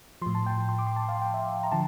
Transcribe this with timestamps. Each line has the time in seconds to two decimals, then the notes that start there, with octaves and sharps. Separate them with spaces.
0.22 A2 F3 C6
0.35 A5
0.46 G5
0.69 C6
0.79 D6
0.87 C6
0.96 A5
1.09 F5
1.22 G5
1.34 E5
1.63 A#5
1.72 D3 F3 A5